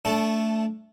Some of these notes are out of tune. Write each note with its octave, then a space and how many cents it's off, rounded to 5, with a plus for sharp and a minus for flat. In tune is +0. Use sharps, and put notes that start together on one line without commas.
A3 +5 D4 -25 A4 +0